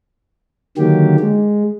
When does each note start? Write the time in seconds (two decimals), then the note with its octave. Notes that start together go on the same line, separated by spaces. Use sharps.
0.78 D3 D#3 F#3 A#3 G4
1.20 G#3